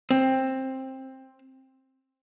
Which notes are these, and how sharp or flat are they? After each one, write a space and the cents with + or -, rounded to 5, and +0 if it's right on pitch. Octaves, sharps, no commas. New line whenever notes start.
C4 +15